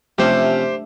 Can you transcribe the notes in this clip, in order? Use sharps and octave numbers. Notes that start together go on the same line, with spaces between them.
C3 F3 A3 C#4 D4 G4 C5